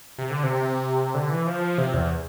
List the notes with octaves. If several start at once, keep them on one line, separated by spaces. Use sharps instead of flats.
C3
D3
C3
D3
E3
F3
C3
E2